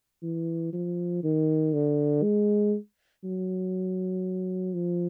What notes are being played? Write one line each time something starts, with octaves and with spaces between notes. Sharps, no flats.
E3
F3
D#3
D3
G#3
F#3
F3